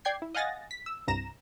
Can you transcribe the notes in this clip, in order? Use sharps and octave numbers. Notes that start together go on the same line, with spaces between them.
D5 G5 G#6 C7
E4
D#5 F5 F#5 G#5 A6 A#6
B6
E6
C2 G2 C3 A#5 A#6 E7